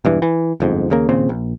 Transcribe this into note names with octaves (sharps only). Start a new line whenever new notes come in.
E1 G2 E3
E3
G1 F2 G#2
D#2 C#3 A#3
D#2 A#2 C#3 C4
A#1